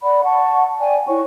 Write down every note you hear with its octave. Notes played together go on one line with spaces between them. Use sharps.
D5 F#5 B5
F#5 A5 C#6
D5 G5 G#5
E4 C#5 C#6